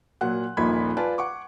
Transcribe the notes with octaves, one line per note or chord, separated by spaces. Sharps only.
A#2 F#3 F#5 F#6
D#1 A#1 A#2 D#4 B5 G#6
F4 B4 D5 G#5 A5
F#5 C#6 D6